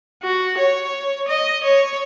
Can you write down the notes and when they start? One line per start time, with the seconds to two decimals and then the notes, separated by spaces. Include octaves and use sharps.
0.23 F#4
0.58 C#5
1.28 D#5
1.64 C#5